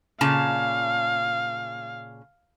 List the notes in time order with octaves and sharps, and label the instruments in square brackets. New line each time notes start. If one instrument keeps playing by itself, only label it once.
[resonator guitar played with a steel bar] A#2 C#3 A5 [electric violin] F5